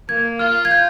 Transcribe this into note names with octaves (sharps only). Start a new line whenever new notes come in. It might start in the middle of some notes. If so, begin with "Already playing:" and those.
A#3 G#6
F4 F6
G#6
G6